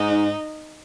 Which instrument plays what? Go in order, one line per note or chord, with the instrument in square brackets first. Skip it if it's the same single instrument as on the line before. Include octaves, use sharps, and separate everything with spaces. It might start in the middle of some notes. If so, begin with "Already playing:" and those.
Already playing: [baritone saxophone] G#2 [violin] D#4